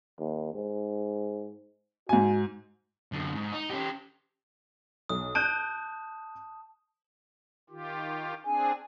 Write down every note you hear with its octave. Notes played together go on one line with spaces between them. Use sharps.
D#2
G#2
G#2 F#4 G#5
F#2 D3
G#2
D#4
C#4 G4
B1 D#6
A5 F#6 G6 D7
D#3 F4 G4
C4 D4 G#4 G#5